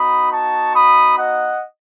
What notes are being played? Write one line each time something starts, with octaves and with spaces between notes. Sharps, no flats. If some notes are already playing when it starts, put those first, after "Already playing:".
Already playing: B3 D#4 F#4 B5 D#6
A5 C#6
B5 D#6
D#5 F#5